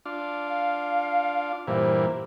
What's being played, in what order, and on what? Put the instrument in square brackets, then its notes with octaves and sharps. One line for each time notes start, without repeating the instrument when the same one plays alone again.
[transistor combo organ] D4 F4
[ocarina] F5
[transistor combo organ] G2 A#2 E3 [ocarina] C5